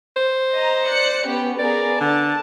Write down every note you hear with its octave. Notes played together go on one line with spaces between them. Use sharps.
C5
D#5 A#5
D5 F#6 C#7
B3 C#4 G4
B3 G#4 A#4 D5
D3 A5